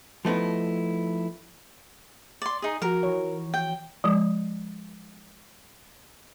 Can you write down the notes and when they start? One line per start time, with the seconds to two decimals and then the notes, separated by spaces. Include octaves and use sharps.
0.25 F3 A3 B3 D#4 E4
2.42 D5 C6
2.62 D#4 G#4
2.82 F3 F#4 A#4
3.03 E3 C#5
3.54 G5
4.04 F3 G#3